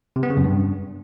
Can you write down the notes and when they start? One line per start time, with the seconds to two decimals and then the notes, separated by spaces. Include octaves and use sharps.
0.16 C3
0.23 B3
0.30 C#3
0.37 F#2
0.44 G2